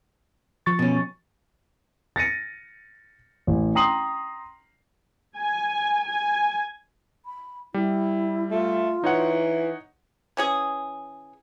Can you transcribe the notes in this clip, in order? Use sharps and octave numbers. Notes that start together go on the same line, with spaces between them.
F3 C#6 A6
B2 C#4
A6 A#6 C#7 D#7
A1
G5 A#5 C6 D#6 C7 F#7
G#5
G#5
B5
G3 E4
A3 F4
E3 D#4 C#5 F#5
E3 C#4 G#4